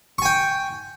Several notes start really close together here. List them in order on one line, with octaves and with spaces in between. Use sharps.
C#6 G#5 G5